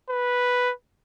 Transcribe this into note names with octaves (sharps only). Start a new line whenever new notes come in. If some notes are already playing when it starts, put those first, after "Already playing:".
B4